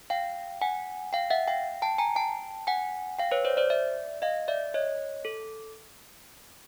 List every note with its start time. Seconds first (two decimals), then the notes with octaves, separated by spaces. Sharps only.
0.10 F5 G5
0.62 F#5 G#5
1.13 F5 G5
1.30 E5 F#5
1.47 F5 G5
1.82 G5 A5
1.98 G#5 A#5
2.16 G5 A5
2.67 F#5 G#5
3.19 F5 G5
3.31 B4 C#5
3.45 C5 D5
3.57 C5 D5
3.70 D5 E5
4.22 D#5 F5
4.48 D5 E5
4.74 C#5 D#5
5.25 A4